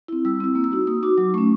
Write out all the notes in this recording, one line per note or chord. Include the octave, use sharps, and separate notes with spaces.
C4 E4
G3 E6
C4 E4 E6
A#3
E6
D#4 F#4
A#3 D#6
D#4 F#4 D6
F#3 D6
A3 C#4 C#6